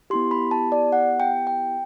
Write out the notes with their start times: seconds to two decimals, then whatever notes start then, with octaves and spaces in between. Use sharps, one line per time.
0.10 B3 E4 G4 C6
0.31 B5
0.51 A5
0.72 D5
0.92 F#5
1.20 G5
1.47 G5